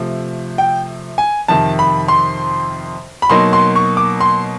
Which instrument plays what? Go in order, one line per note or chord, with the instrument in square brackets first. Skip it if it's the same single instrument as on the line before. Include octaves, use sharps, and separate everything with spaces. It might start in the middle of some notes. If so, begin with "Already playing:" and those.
Already playing: [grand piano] C3 F3 A3
G5
G#5
F2 C3 D#3 A5
B5
C6
B5
B2 F#3 A#3 D#4 C6
C6
C#6
D6
C6